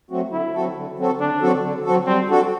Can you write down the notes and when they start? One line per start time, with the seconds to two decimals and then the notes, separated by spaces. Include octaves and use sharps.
0.11 F#3 A3 C4 F#4
0.32 D3 E4
0.54 F#3 C4 F#4 A4
0.76 D3
0.98 F#3 C4 F#4 A4
1.20 D3 D4
1.42 F#3 C4 F#4 A4
1.63 D3
1.85 F#3 C4 F#4 A4
2.06 G3 C4
2.29 D4 F#4 A4